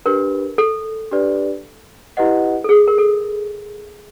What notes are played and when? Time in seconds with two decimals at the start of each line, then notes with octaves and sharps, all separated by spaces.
0.06 D4 G4 A#4 B4
0.58 A4
1.11 D4 G4 B4 D5
2.17 E4 G4 B4 D#5 F#5
2.64 A4
2.69 G#4
2.88 A#4
2.98 A4